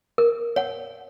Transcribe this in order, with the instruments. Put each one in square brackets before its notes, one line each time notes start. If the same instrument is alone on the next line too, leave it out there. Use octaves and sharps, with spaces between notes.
[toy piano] A#4
C#5 F#5